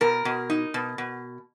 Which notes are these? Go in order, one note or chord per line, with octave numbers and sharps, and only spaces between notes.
B2 A#4
B2
D#4
B2
B2